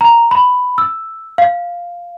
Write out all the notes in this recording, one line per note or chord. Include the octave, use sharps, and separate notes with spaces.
A#5
B5
E6
F5